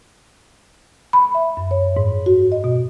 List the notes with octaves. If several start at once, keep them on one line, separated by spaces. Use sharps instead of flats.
B5
E5
F#2
C#5
G#2
F#4
D#5
B2